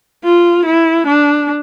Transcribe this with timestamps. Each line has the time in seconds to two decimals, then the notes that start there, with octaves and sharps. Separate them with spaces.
0.24 F4
0.65 E4
1.07 D4